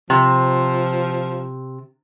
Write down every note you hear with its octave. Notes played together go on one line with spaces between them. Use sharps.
C3 F3